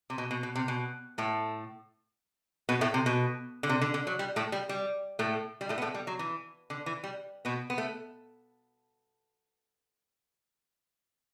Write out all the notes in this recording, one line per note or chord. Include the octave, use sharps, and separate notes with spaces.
C3
B2
B2
B2
C3
B2
A2 A3
B2 B3
A2 A3
C3
B2
D3
C3
D3
D3
F#3
G3
A2 A3
G3
G3
A2 A3
G3
A2 A3
B3
A2 A3
G3
F#3
E3
D3
E3
G3
B2 B3
B3
A3